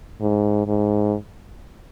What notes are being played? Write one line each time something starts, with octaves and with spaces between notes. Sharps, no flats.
G#2
G#2